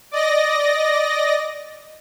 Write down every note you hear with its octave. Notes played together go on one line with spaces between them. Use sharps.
D5 D#5 A#6